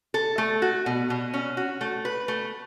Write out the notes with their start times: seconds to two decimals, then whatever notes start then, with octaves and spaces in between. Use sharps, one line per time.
0.14 A4
0.38 A3
0.62 F#4
0.86 B2
1.10 B2
1.34 C#4
1.57 F#4
1.81 A3
2.05 B4
2.28 A3